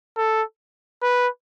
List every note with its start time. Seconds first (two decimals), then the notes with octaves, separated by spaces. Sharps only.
0.17 A4
1.02 B4